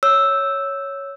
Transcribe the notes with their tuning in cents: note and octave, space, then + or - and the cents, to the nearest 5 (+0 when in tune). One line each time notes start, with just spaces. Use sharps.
C#5 +0 E6 +0